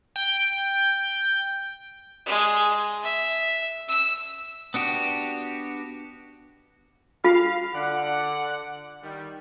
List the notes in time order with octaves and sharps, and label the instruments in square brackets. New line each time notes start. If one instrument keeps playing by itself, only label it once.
[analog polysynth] G5
[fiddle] G#3
E5
E6
[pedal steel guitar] B3 D4 F#4 G4
[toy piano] F4 [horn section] F5
[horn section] D3 D5 F#5
D#3 G3